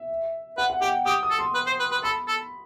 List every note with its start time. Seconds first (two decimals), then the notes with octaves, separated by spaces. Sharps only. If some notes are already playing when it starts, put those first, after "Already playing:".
Already playing: E5
0.57 B4 F#5
0.70 F#5
0.81 G4 G5
1.06 G4 D#6
1.23 D#6
1.30 A4
1.39 C6
1.54 B4
1.67 C5
1.80 B4
1.91 B4
2.04 A4 B5
2.28 A4